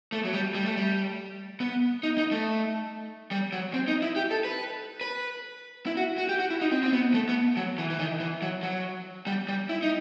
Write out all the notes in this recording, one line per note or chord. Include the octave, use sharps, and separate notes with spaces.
A3
F#3
G3
G3
A3
G3
B3
D#4
D#4
A3
G3
F#3
C4
D#4
E4
G4
A4
B4
B4
E4
F#4
F#4
G4
F#4
E4
D#4
C4
C4
B3
A3
B3
F#3
E3
E3
D#3
E3
F#3
F#3
G3
G3
E4
D#4